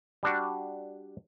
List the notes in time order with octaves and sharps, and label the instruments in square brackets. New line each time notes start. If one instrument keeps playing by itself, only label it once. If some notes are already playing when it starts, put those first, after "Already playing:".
[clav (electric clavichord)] G3 D4 F#4